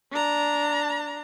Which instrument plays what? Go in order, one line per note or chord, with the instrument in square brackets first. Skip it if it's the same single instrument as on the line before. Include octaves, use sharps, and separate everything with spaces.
[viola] D4 A#5